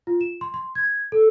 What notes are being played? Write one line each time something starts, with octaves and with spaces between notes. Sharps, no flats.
F4
E7
C6
C6
G#6
A4